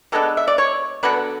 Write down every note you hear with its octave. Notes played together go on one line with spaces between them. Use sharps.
E3 G#3 B3 D4 A4
E5
D5
C#5
D3 F#3 B3 D4 B4